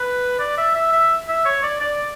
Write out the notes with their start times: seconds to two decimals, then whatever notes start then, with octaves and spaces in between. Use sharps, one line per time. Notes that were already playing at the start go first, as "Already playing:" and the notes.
Already playing: B4
0.39 D5
0.57 E5
0.75 E5
0.93 E5
1.28 E5
1.45 C#5
1.63 D5
1.80 D5